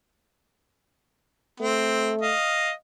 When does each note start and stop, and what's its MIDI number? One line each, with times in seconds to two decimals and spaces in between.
1.60 2.33 57
1.60 2.11 60
2.21 2.71 75
2.21 2.71 77